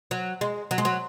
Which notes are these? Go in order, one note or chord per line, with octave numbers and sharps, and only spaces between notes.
F#3
G#3
F#3
G#3
F#3